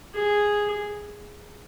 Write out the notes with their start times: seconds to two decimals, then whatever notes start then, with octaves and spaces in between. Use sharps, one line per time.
0.14 G#4